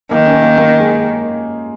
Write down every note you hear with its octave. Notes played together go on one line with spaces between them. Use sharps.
D#3 A#3
C#4
A#3
A#3
G#3